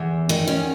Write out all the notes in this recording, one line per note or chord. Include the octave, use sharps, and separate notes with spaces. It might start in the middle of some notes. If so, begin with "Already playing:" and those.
Already playing: E2
D#3 D#4
C#4